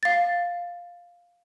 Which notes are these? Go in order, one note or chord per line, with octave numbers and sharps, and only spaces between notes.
F5 A6